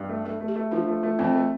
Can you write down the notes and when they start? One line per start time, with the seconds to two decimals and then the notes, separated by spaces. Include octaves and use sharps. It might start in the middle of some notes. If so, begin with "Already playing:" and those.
Already playing: G2
0.09 A3
0.24 A3 A4
0.40 A3
0.48 G4
0.56 A3
0.71 F3 D4
0.88 A3
1.03 A3
1.19 F2 C4
1.35 A3